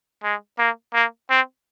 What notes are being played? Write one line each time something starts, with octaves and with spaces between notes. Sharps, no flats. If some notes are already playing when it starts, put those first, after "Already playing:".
G#3
A#3
A#3
C4